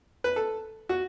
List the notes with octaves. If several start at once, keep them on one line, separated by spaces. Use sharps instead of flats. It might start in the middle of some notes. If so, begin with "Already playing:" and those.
B4
A4
F#4